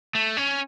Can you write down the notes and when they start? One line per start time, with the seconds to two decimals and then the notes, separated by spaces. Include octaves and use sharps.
0.15 A3
0.37 C#4